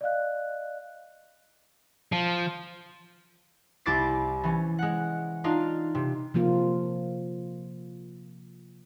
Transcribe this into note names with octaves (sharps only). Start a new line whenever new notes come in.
D5 D#5 F5 F#6
F3
C2 E4 D6 A6 C7
E3 C#4
G#3 F#5
D4 D#4 F4 F5
C3
C3 F3 A#3 F4